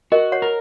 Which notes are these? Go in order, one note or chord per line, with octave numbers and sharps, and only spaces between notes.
F#4 A#4 D#5
C#5 F#5
A#4